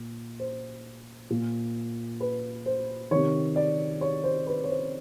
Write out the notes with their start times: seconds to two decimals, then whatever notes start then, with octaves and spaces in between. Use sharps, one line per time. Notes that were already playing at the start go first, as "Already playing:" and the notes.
Already playing: A#2
0.40 C5
1.30 A#2
2.20 B4
2.66 C5
3.11 C3 D#3 C#5
3.56 D5
4.01 C#5
4.24 C5
4.47 B4
4.64 C#5
4.70 C5